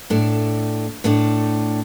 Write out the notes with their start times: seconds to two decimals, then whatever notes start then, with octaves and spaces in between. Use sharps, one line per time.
0.10 A2 A3 D4
1.04 A2 A3 D4